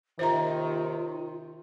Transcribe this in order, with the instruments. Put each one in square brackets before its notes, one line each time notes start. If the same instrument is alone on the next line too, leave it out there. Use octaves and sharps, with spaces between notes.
[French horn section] D#2 C3 D#3 [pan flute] F4 [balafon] C5 E5 A#5